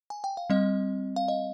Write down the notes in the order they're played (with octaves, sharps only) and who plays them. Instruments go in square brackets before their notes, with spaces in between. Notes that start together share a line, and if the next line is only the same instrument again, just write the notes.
[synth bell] G#5
G5
F5
G3 C4 D#5
F5
D#5